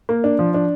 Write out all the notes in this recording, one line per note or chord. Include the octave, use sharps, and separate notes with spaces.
A#3
D4
F3
D4